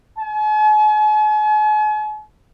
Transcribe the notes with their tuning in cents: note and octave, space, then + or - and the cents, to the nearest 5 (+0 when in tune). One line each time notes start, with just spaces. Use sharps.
G#5 +45